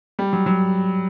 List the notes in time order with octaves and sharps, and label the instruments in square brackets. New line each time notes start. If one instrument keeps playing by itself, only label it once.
[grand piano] G3
F#3
F#3